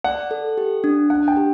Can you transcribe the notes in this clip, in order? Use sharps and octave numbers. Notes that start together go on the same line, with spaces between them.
D5 F#5
A4
G4
D4
D4 F#5
G5
G4